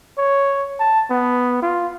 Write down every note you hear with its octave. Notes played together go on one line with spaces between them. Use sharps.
C#5
A5
B3
F4